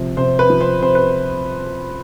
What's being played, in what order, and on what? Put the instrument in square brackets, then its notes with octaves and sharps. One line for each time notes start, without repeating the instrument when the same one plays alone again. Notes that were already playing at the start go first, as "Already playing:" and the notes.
Already playing: [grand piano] C3 F3
C3 C5
B4
F3
C5
C3 C5
B4